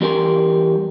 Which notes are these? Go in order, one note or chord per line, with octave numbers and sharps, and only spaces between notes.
E2 G3 A#4 G#5 C6